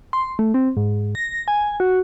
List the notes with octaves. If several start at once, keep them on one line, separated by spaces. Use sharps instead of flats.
C6
A3
C4
G#2
A#6
G#5
F#4